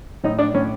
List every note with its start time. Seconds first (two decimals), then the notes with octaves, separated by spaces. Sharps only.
0.24 A2 D#4
0.38 D4
0.54 A2 C#4